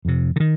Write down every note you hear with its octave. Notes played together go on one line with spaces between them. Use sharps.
F2 C3
D3
D#3